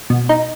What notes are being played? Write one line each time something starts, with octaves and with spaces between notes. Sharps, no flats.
B2
D#4